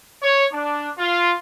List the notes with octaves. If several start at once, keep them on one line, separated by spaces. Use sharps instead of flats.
C#5
D4
F4